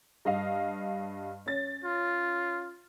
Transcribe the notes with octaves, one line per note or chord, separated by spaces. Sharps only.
G2 D#5 F5
C#4 A6
F4